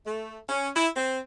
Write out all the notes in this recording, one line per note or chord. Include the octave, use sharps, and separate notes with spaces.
A3
C#4
E4
C4